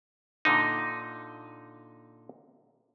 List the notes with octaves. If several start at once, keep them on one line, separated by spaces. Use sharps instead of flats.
A#2 D3 D#4